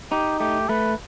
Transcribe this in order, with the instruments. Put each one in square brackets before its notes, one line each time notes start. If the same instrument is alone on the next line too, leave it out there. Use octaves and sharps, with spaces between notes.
[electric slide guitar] D#4 [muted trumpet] G4
[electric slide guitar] A3 [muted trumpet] G4
[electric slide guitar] A3 [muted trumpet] B4